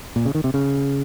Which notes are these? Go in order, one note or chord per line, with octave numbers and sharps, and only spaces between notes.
A#2
C#3
D#3
C3
C#3